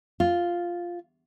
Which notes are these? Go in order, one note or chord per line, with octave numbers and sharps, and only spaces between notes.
F4